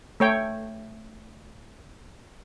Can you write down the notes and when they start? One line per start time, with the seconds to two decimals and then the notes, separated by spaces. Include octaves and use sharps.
0.20 A3 C#5 G5